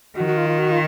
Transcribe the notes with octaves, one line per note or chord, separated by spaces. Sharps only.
D#3 F#4
F#4
F4
F4
F#4
F4